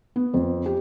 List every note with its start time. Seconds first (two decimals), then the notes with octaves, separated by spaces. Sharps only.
0.16 B3
0.34 F2
0.66 G4